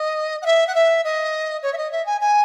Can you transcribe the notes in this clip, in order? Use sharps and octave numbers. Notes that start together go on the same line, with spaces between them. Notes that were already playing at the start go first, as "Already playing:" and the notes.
Already playing: D#5
F#5
E5
F#5
E5
D#5
C#5
E5
D#5
E5
G#5
G#5